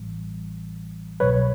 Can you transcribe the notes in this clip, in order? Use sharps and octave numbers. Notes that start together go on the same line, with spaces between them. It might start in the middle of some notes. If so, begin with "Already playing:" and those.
Already playing: A1 A2 E3 G3
C2 B2 F#3 B4 C#5